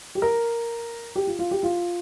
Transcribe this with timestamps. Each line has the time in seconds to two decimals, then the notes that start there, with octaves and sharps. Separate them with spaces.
0.15 G4
0.22 A#4
1.16 G4
1.27 F4
1.39 F4
1.51 G4
1.63 F4